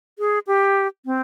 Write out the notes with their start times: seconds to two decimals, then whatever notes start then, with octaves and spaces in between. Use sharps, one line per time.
0.19 G#4
0.47 G4
1.06 C4